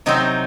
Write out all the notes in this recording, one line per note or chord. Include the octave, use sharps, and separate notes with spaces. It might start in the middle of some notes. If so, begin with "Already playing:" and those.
C3 F#3 C4 D#4